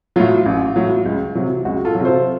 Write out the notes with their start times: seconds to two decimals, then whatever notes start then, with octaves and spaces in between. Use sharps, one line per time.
0.16 A2 F#3 F4
0.46 A1
0.76 A2 F#3
1.06 C#2
1.35 C3 F#3
1.65 C#2 F#4
1.85 F4 A4
1.95 C3 F#3
2.05 A4 C5